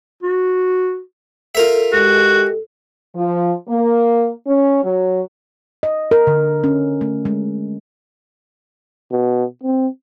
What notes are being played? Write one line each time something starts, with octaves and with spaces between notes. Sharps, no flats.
F#4
F4 A4 A#4 E5
G#3 F#4 G4
F3
A#3
C#4
F#3
D#5
A#4
D3
C#4
A3
G#3
B2
C4